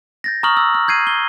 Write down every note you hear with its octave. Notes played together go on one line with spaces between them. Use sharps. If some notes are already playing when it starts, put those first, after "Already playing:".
G6 A6 A#6
A#5 C#6 D#6 F6 F#7
E6
F6
G6 G#6 C7 D#7
G7